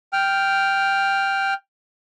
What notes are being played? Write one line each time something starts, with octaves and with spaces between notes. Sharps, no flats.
G5 F6